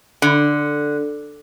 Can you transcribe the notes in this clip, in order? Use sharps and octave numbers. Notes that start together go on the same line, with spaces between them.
D3